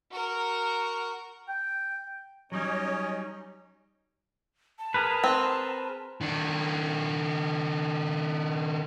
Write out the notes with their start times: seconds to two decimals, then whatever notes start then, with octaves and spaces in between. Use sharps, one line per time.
0.12 F#4 A#4
1.49 G5
2.52 F#3 G3 C#4 D#4 C#5 D#5
4.79 A5
4.94 G#4 A#4 B4
5.24 C4
6.21 D#3 D4